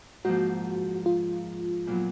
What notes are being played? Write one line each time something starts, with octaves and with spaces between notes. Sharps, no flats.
G#2 F3 A#3 F#4
F4
A#2 F#3 B3